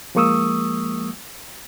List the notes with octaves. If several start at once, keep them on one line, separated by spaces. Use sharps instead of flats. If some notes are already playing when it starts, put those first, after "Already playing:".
F3 G#3 A#3 C#6 D#6 E6